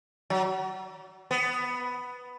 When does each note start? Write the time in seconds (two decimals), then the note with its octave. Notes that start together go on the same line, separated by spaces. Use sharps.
0.30 F#3
1.31 B3